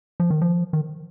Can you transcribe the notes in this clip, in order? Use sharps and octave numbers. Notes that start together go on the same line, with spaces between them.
F3
D#3
F3
D#3